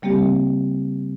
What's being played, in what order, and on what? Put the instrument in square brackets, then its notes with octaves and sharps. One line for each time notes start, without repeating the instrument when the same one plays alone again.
[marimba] C#3 G3 A#3 C4 G4